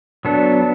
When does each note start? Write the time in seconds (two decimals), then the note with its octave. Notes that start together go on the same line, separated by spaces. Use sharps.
0.25 F#3 B3 D4 A4